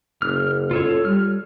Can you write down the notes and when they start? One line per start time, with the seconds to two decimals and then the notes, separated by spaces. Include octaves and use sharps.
0.22 F#1 F6
0.71 F4 A4 C#5
1.05 G3 F6